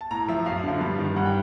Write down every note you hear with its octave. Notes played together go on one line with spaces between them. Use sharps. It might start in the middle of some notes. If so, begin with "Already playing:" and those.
A5
A2 A#5
F3 E5
F#2 F5
D3 F3
G2
D#3
G2 F#5
G5